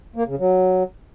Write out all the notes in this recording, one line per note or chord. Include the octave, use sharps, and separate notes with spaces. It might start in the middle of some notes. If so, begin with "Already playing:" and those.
A#3
C#3
F#3